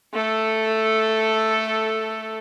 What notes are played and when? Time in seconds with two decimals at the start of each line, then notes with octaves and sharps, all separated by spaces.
0.14 A3 A4